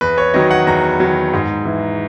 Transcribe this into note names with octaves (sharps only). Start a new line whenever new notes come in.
E2 B4
C#5
D#3 F#3 D#5
F#5
E2 A#5
D#3 F#3
G#2
E3